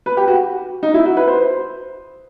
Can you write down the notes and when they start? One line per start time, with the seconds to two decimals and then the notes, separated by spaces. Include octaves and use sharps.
0.06 B4
0.17 G4
0.28 F#4
0.83 D#4
0.94 E4
1.05 F#4
1.17 B4
1.28 C5